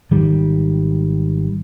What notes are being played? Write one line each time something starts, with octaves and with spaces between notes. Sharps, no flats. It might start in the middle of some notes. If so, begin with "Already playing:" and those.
G#1 D#3 G3